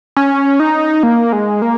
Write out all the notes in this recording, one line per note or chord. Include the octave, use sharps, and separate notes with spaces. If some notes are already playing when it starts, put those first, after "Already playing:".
C#4
D#4
A#3
G#3
A#3